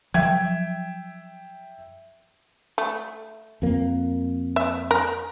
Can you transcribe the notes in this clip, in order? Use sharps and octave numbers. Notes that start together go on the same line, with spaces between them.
F3 F#3 E5 G5 G#6
A3
F2 A#3
E5
A#4